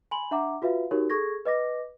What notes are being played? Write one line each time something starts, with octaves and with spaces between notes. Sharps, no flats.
G#5 B5 C6 F#7
D4 E5 F#5 A#5 D6
F4 F#4 B4 E5 F5
D#4 F#4 G4 A#4 C#5
G#4 A4 C#6 G#6 A#6
B4 D#5 D6 A#6